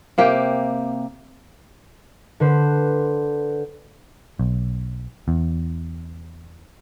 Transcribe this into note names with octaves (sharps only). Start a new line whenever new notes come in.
C3 A#3 G4 G5
D3 B4 C5
B1
E2